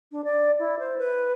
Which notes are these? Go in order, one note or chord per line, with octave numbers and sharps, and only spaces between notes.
D4
D5
E4
C5
B4